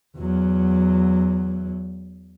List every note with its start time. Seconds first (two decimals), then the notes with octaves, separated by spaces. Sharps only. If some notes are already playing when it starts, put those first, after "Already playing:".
0.17 E2 F#3